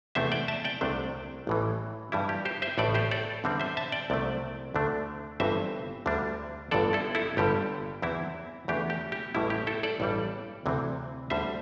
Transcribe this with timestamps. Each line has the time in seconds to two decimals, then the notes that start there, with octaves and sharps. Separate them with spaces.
0.15 E2 C3 A3 E4 C5 E5
0.32 D5 G5
0.48 E5 A5
0.64 D5 G5
0.81 C2 C3 A3 D4
1.47 A1 A2 E3
2.12 G2 E3 G3 E4
2.29 G4
2.45 G4 C5
2.62 C5 E5
2.78 A1 A2 A3 A4 D5
2.94 G4 C5
3.11 A4 D5
3.44 E2 D3 G3 C4
3.60 C5 E5
3.77 E5 A5
3.92 D5 G5
4.10 C2 C3 A3
4.75 D2 D3 A3 D4
5.40 G1 G2 E3 C4 C5 E5
6.06 D2 D3 G3 D4
6.71 G1 G2 D3 A4 D5
6.93 E4 A4
7.15 E4 A4
7.37 G1 G2 D3 G3 G4
8.02 E2 E3 C4 E4
8.68 E2 E3 A3 D4 G4
8.90 G4
9.12 G4
9.35 A1 A2 E3 G3 E4
9.50 G4
9.67 E4 A4
9.83 A4 D5
10.00 A1 G2 E3 G3
10.66 D2 C3 E3 C4
11.30 D2 D3 G3 C5 E5